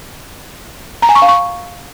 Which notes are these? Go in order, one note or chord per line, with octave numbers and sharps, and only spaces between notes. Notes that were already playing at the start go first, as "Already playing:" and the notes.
A#5
G#5
C#6
F5
C#6